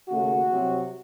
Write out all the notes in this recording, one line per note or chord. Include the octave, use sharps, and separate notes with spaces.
D#2 C#3 A3 F#4
C2 C3 F#3